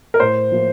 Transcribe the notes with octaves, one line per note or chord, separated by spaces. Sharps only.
A#4
A2 C5
F3 A#3